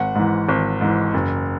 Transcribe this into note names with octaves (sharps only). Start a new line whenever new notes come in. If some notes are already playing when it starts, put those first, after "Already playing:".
Already playing: G#1 F#5
G#2 E3
G#1
G#2 E3
F#1